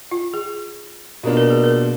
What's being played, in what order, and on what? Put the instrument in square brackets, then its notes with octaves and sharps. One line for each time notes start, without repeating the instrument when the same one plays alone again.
[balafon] F4
G#4
[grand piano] B2 A#3 D4 F4
[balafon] A#4
G#4
A#4